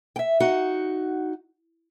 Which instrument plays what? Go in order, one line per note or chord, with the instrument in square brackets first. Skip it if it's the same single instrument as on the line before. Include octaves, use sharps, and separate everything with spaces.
[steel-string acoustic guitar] E5 G5
D#4 F#4 F#5